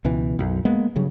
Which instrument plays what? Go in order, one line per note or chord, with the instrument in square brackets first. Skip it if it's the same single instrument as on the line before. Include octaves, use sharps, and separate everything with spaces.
[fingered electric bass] C#2 B2 E3
B1 F#2
G#3 A#3 B3
G2 C#3 F#3